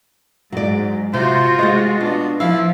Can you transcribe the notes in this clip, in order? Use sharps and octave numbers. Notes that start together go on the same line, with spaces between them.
G#2 F#3 D5
C3 F4 F#4 C5
G#3 G4 D#5
B2 D4
F3 E4 F5